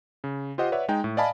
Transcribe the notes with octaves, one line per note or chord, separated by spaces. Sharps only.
C#3
F4 G4 C5 D#5 F#5
B4 C#5 D5 E5 F#5
G#3 D#4 G5
A2
D5 D#5 F5 G#5 A5 B5